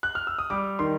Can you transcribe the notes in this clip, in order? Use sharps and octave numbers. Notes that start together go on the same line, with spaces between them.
F#6
F6
E6
D#6
G3 D6
D#3 C6